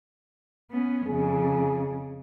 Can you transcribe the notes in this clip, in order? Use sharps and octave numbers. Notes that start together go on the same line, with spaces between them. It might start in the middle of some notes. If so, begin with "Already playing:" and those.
B3 C#4
F2 C#3 G#4